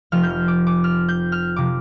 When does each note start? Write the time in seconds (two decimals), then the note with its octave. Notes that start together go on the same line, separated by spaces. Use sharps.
0.12 F1 F2 F3 F6
0.23 G6
0.30 F6
0.48 D6
0.67 D6
0.84 F6
1.08 G6
1.32 F6
1.56 C3 F3 D6